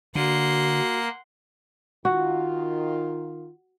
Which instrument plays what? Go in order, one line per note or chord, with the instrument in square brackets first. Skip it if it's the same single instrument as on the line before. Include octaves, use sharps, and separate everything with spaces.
[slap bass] D3 [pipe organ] A#3 [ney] F#4 [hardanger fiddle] F#5 C6
[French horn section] D#3 F4 [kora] F#4